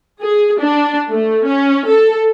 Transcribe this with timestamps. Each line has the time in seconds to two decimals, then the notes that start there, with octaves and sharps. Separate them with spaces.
0.21 G#4
0.59 D4
1.10 A3
1.46 C#4
1.86 A4